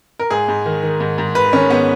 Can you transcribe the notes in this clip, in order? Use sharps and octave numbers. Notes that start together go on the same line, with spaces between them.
A#4
G#2 G#4
G#2
D#3
D#3
G#2
G#2
D#3 B4
D#3 C#4
G#2 B3